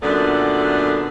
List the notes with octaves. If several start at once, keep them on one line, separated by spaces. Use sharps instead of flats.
F#2 A#2 D3 A3 B3 D4